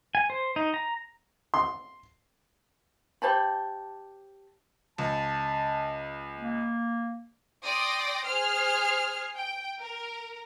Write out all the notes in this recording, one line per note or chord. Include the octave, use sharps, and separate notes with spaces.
G#5
C5
D#4
A#5
C6
G4 C5 A5 B5
C#2 A5
A#3
D5 G5 C6 D#6 A#6
G#4 C5 F6 C7
G5
A#4